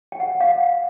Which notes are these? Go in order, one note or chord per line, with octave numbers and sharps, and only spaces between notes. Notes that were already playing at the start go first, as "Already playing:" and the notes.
G5
F#5
F5